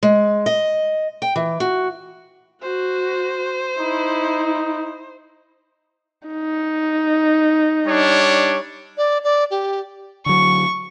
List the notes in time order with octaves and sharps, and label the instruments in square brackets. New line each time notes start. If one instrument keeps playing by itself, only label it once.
[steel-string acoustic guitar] G#3
D#5
G5
E3
F#4
[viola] F#4 [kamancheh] C5
[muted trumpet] D#4 [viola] E4
[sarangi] D#4
[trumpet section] G3 D4 C#5
[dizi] D5
D5
G4
[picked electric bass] D3 F#3 [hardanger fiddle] C#6